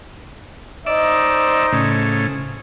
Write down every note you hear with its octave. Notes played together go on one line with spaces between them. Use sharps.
D#4 C5 D5 D#5 E6
A2 C#3